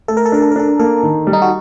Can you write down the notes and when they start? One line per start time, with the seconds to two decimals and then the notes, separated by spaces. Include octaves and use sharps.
0.08 A3 A4
0.17 A#4
0.26 A4
0.32 D4 A#4
0.42 A4
0.51 A#4
0.56 D4 A4
0.79 A#3 A4
1.03 D#3
1.27 G3
1.33 D#4
1.42 F#4